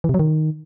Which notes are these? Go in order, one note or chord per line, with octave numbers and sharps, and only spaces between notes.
E3
C3
F#3
D#3